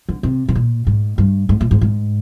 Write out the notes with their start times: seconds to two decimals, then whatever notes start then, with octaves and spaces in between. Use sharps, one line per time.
0.09 D3
0.23 C3
0.48 C3
0.55 A#2
0.87 G#2
1.18 G2
1.49 G#2
1.61 A#2
1.71 G#2
1.81 G#2